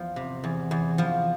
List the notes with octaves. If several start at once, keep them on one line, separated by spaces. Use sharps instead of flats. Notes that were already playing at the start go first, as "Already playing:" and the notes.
Already playing: E2 F3
C3
E2
E2
F3